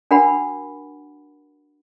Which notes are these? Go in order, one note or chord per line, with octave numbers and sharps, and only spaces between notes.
D4 F#4 A#4 F#5 B5